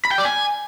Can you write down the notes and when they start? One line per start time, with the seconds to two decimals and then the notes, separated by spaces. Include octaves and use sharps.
0.05 B5
0.11 G5
0.18 D5
0.25 G#5